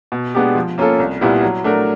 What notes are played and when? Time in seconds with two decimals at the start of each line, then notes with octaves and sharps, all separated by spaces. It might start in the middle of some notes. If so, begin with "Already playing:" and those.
0.12 B2
0.35 G#3 B3 D4 G4
0.55 F3
0.78 A#3 C#4 F4 A4
0.99 C2
1.21 A#2 G3 B3 E4
1.43 F#3
1.64 A3 D4 F#4 A#4